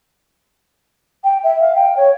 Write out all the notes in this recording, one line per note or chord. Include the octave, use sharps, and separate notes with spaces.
G5
E5
F5
G5
C#5